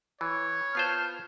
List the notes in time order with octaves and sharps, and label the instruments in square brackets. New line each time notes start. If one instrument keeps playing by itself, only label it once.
[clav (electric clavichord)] E3 [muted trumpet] C#5
[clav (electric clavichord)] B3 F4 C5 [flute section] A5 F6 G6